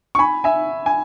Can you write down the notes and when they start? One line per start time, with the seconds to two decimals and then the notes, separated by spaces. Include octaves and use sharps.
0.15 C#6
0.19 G#5 B5
0.44 E5 G#5
0.86 G#5